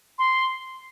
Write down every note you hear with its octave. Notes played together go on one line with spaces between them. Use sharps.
C6